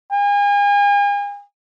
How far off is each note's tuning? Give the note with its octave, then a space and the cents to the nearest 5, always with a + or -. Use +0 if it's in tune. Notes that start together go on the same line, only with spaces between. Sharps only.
G#5 -40